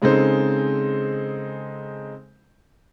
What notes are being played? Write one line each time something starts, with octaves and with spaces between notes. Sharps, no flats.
C#3 G#3 C4 D#4 A4 C5